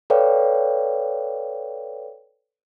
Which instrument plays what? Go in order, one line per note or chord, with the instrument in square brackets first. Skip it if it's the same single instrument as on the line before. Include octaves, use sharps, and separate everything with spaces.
[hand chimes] A4 B4 C#5 D5 F5 G5